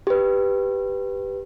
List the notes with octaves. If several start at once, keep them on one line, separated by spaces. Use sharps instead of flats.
G4 B4